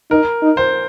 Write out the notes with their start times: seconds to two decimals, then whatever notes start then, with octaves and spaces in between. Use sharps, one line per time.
0.11 D#4 A#4
0.42 D#4
0.57 C5